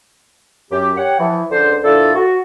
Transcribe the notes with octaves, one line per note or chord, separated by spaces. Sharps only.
F#2 G4
G4 C#5 F#5
E3 F3
C#2 D3 C5
A#2 F3 D4 E4 F4 A4
F#4